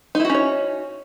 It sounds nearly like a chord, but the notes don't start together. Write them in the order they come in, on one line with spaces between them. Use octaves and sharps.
D#4 E4 F#4 C#4 C#5